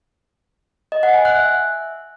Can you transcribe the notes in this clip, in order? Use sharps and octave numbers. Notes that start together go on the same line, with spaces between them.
D#5
F#5
G#5
F#6
E5